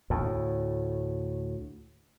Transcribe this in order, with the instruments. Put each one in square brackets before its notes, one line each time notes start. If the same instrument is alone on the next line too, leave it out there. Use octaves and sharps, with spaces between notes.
[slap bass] D2 A2